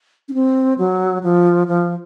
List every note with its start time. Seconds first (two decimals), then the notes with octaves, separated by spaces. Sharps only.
0.29 C#4
0.34 C4
0.78 F#3
1.23 F3
1.68 F3